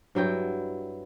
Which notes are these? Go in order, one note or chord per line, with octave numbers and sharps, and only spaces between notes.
G2 F#3 E4 G5